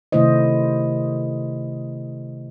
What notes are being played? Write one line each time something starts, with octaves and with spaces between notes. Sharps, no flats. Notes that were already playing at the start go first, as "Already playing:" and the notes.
C3 D#3 A3 E4 C5 D#5